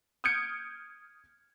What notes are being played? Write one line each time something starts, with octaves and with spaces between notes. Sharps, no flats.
D#6 F6 G6 G#6 C#7 D7